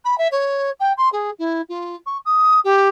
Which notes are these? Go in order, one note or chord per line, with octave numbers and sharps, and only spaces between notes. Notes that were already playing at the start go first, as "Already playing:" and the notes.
B5
E5
C#5
G5
C6
G#4
E4
F4
C#6
D#6
G4